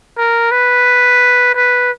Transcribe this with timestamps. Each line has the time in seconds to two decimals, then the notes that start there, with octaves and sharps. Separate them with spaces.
0.17 A#4
0.52 B4
1.55 B4